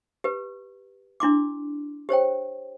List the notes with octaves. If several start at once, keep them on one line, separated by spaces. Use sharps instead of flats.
G4 B4
D4 E4 C6 D6
G4 C5 C#5 G5